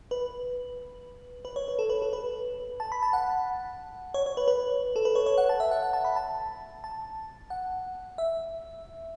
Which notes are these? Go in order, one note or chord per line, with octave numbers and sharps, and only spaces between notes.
B4
B4
C#5
B4
A4
B4
A4
B4
A5
B5
A5
F#5
C#5
C#5
B4
B4
A4
B4
C#5
C#5
F#5
A5
E5
F#5
F#5
A5
B5
A5
A5
F#5
E5